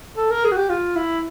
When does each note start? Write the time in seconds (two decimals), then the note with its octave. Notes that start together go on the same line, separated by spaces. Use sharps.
0.17 A4
0.30 A#4
0.45 G#4
0.52 F#4
0.57 G4
0.70 F4
0.96 E4